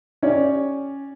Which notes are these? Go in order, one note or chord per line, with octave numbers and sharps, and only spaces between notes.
C#4 G4 C#5 D5